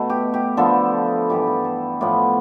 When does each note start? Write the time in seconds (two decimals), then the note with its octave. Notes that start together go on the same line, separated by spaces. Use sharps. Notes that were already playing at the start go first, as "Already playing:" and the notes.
Already playing: B2 A3 A4
0.10 G4
0.34 G4
0.57 D3 F3 B3 A4
1.30 G2 E3 B3 G4
1.47 A4
1.65 A4
2.01 A2 F3 B3 D5